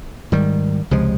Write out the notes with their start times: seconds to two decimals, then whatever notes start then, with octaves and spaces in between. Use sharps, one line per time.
0.32 G#2 D#3 G3
0.91 C#2 C3 F3 G#3